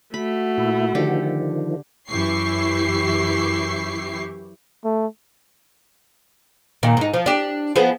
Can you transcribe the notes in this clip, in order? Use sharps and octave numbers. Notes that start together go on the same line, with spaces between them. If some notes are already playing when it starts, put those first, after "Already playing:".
A3 F#4 B5
A#2 E4
D3 D#3 F3 G4
F#2 E3 E4 G4 C#6 C7
A3
A#2 D#3
G#2 D#4
F3
D4 G4
F3 B3 G#4